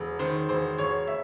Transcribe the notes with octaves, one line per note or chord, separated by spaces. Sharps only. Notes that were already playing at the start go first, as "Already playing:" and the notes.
Already playing: E1
D#3 C5
E1 C5
E1 C#5
E5